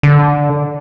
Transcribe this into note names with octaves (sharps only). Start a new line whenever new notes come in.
D3